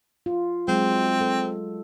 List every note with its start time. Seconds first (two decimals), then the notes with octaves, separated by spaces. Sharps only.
0.26 F4
0.68 F#3 G#3 C4
1.21 A4